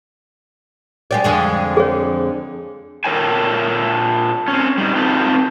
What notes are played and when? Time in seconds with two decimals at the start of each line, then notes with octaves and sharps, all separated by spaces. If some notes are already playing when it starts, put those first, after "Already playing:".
1.11 G#3 G4 D5
1.24 F2 D3 G#3
1.77 G#4 C#5
3.04 A#2 A4 A#4 C#5 G5 G#5
4.48 C4 C#4
4.78 G3 D#4
4.96 C4 D#4 F4 G4 A4 B4